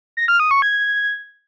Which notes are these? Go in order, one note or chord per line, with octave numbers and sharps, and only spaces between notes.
A#6
F6
D#6
C#6
G#6